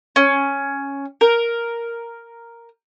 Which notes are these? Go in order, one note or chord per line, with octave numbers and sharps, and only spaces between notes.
C#4
A#4